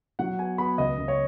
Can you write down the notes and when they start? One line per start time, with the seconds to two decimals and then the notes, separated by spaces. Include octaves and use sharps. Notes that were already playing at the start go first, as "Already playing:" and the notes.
0.19 F#3 F#5
0.39 B3 G#5
0.58 B3 B5
0.78 C#2 D#5
0.98 C#2
1.08 C#5